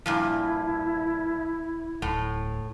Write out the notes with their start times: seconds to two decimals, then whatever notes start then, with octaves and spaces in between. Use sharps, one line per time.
0.06 G2 A#2 F3 E4
2.02 D1 A2